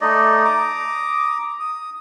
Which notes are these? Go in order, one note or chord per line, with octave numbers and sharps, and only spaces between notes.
A3 D#4 D5 D#5
A#5 D6 D#6
D#6